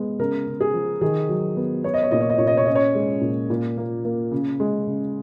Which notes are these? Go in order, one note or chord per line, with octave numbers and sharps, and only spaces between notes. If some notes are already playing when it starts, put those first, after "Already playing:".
Already playing: G#3 B3
C#3 A#4
C#3
G#4
F3
D#3 G#4
F#3
B3
B3 C#5
D#5
C#5
A#2 D#5
C#5
D#5
A#2 C#5
D#5
C#5
C#4 D#5
C#5
G#3
A#2
A#2
A#3
A#3
C#3
G#3
C#3